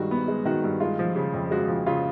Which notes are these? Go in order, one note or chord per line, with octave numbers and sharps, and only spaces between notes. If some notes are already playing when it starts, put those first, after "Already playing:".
Already playing: G2 D#3 G#3 F#4
B3
G#3
D#3 F#4
G2
G#3 F4
F3
C#3
F2
G#3 F#4
F3
C#3 F4